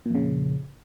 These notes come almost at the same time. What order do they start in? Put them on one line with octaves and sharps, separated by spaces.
A#2 F2 C#3